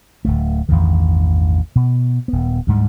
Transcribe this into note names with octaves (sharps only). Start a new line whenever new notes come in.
D1 D2 A3
A1 E2 G2 D#3
B2
D#1 B3
D2 G#2 G3